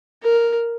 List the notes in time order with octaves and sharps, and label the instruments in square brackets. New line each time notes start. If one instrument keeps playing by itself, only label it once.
[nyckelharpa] A#4